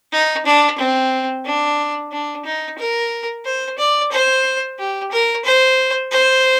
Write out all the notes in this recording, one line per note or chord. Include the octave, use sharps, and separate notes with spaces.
D#4
D4
C4
D4
D4
D#4
A#4
C5
D5
C5
G4
A#4
C5
C5